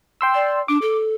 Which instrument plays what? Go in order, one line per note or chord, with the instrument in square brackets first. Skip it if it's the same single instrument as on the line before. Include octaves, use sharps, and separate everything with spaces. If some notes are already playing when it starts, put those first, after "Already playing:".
[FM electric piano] G5 C6 E6
[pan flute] D5
[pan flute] D4 [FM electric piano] D6
[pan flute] A4